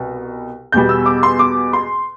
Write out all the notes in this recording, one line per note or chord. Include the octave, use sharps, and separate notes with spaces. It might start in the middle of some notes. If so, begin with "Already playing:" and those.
Already playing: C2 B2
E2 B2 G3 G6
E6
D6
C6
D6
C6